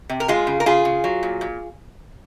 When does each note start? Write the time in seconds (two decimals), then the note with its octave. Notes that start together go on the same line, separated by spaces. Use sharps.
0.09 C3
0.20 A#4
0.28 G#3 F4 G#4
0.47 C#3
0.60 A#4
0.66 C#3 F4 G#4
0.85 C#3
1.04 F#3
1.23 A#2
1.41 A#2